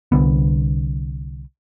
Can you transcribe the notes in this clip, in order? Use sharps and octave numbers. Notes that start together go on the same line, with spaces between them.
C2 D3 B3